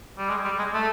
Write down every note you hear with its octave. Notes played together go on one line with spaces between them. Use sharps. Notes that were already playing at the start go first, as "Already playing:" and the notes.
G3
G#3
G3
G#3
A3